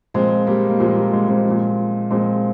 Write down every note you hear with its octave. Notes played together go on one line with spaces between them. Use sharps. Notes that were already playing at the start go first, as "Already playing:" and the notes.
A#2 F3 G#3 C4
G3 A#3
A#3
A#2 F3 G#3
G3
G#3
G#3 C4
F3
A#2
A#2 F3 G#3 C4